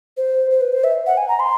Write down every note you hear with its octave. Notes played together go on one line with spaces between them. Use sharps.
C5
C5
B4
C5
E5
F#5
G#5
A#5
C6